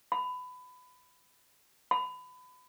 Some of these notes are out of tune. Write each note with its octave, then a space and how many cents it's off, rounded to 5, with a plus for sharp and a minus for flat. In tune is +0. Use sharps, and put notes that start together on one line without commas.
B5 +20
B5 +25